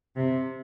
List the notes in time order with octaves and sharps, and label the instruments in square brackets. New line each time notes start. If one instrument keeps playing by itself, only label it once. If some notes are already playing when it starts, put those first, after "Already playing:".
[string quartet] C3